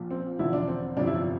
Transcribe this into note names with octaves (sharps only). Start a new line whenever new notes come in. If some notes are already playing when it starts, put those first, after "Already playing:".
Already playing: A#1 A#2 F3
C4
E1 E2 D3 F3 E4
D4
C4
G1 F2 C3 D4
E4
F4